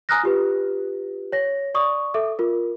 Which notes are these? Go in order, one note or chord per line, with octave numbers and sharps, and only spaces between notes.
G#5 A#5 D#6 F6 F#6 A#6
F4 G4 B4
C#5 A#6
D5 C#6 D#6
A4 E5 D6
F4 A#4